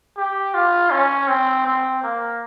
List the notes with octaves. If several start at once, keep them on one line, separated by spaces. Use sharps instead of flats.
G4
F4
C#4
C4
C4
A#3